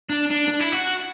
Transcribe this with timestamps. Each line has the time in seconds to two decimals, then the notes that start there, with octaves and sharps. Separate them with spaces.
0.09 D4
0.30 D4
0.47 D4
0.60 E4
0.72 F#4